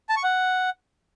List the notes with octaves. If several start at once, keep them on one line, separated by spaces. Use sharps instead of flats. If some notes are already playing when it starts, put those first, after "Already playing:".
A5
C#6
F#5